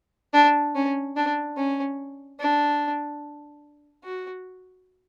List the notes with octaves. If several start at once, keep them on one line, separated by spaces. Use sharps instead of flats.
D4
C#4
D4
C#4
D4
F#4